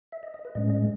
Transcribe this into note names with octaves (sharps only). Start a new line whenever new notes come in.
E5
D#5
D#5
B4
A2 G#3 C#4 D#5
D#5